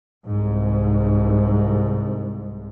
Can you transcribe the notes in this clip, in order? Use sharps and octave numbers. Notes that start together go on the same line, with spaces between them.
C2 G#2